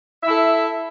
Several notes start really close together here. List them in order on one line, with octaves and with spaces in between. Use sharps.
E5 E4 A4